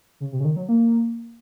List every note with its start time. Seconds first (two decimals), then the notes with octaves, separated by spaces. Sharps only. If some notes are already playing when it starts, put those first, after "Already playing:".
0.20 C#3
0.32 C3
0.40 C#3
0.45 D#3
0.56 F#3
0.69 A#3